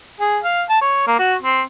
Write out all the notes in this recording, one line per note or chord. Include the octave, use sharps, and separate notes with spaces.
G#4
F5
A5
C#5
A#3
F#4
C4